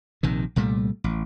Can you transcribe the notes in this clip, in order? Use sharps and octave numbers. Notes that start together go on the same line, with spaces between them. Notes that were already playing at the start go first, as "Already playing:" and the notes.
A#1 C3 D#3
C2 A#2 G3 A3
A1